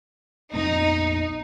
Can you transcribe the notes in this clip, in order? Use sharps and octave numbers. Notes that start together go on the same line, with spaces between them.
A#1 F2 B3 D#4